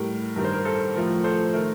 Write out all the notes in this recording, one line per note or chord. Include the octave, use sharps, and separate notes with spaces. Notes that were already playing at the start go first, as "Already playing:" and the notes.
Already playing: A2 G3 A#4
G2 D#3 G3 A#4
C5
A#4
A4 C5
A2 F3 A3 A#4
A4 C5
D#3 A3 A#4